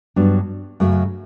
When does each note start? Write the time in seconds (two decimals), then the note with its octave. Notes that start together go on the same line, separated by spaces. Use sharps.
0.16 G2 F#3 B3 D4
0.80 F#2 C#3 F#3 A3